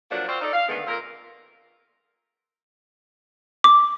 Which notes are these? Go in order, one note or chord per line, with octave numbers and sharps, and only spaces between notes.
F3 F#3 A#3 D4 F#4
C4 F4 F#4 C5 D5 F5
D#4 A4 D5
F5
D3 D#3 G#3 A3 B3
F2 A#2 C4 A#4
D6